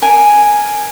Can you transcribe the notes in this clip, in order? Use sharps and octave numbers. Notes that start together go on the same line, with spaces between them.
A#4 G#5